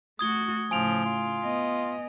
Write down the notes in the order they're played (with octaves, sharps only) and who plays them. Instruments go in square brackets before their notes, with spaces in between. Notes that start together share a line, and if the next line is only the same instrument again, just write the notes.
[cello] A3 F#4 [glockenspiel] D#6 G#6 G7
[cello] A2 C#3 [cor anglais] F3 [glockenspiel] G#5 D7 F7
[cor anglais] F4
[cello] B3 D#5